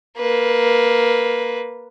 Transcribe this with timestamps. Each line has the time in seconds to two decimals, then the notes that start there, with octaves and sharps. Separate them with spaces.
0.18 A#3 B4